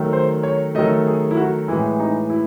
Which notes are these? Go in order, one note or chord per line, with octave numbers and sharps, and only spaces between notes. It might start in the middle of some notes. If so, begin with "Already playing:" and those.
Already playing: D#3 F#3 A3
C5
C#5
D#3 F#3 A3 D#5
G#4
E4
F#4
A2 E3 G#3 E4
D#4
E4